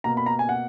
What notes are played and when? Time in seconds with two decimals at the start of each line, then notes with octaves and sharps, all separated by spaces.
0.04 B2 A#3 A#5
0.17 B5
0.26 A#5
0.39 G#5
0.49 F#5